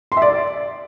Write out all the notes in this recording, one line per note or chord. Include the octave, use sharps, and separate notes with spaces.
C6
E5
D5